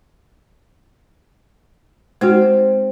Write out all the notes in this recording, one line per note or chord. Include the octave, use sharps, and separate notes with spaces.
G#3 C4 D#4 F#4